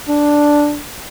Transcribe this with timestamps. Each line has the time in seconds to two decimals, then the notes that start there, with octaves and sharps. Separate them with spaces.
0.08 D4